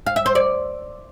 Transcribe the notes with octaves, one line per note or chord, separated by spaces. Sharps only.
F5
E5
C5
D5